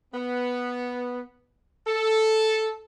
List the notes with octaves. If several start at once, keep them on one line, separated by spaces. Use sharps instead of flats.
B3
A4